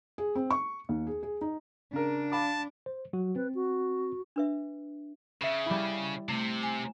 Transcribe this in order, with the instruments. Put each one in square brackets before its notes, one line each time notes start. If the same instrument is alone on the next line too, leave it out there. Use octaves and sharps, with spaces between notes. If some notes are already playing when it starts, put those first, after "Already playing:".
[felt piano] G#4
C4
C#6
D#2
G#4
G#4
D#4
[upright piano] C#3 A#4 [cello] D4
[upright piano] F5 B5 D6 [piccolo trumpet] A5
[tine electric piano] C5
F#3 F#4
[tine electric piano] C4 [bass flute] B4
[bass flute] F#4
[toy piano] D4 B4 E5
[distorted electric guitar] C#3 [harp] E5 E7
[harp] G3 E4
[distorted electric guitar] C3 [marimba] A3
[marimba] G#5